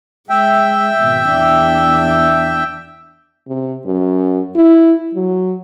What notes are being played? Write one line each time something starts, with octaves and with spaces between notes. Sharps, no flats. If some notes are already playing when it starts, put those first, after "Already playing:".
G#3 E5 G5
G#1 B2
E2 D4
C3
F#2
E4
F#3